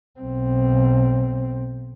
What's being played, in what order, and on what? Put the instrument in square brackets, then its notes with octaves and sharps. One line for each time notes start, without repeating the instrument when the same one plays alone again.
[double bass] B1 C4